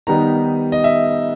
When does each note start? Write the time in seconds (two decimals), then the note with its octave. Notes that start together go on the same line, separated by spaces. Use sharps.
0.07 D#3 G3 B3 D#4 A#5
0.72 D#5
0.84 E5